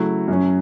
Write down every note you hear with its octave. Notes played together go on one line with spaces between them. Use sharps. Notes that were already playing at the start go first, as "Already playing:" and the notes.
Already playing: C#3 F#3 A3 E4
F#2 F#3 C#4